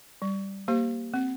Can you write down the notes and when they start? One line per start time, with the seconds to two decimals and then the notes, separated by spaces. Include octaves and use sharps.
0.22 G3
0.68 A#3 G4 C5
1.14 C4